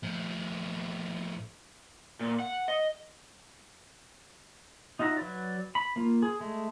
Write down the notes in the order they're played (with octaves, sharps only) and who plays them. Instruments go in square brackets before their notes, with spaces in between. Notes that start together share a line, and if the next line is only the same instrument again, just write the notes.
[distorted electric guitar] A2 F3
[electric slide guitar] A#2
F#5
D#5
[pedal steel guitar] D#4 F4 F#4 E5 A#5
F#3 B4 D5
B5
A#3 F4
G#4
G#3 A3